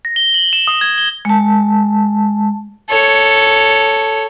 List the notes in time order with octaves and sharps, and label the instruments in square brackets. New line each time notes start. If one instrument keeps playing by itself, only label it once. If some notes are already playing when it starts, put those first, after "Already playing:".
[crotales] A#6
G7
F#7
E7
D#6
G#6
G7
[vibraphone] G#3 A5
[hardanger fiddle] A4 C#5